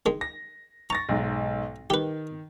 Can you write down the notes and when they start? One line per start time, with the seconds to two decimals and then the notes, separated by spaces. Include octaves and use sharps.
0.06 D#3 G#3
0.21 A#6
0.90 A#5 C#6 A6 A#6
1.09 B1 G#2
1.90 D#3 G4 B4